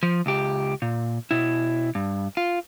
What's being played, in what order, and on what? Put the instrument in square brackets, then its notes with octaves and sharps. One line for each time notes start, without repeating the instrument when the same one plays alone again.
[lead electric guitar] F3
C#2 G4
A#2
B2 E4
G2
F4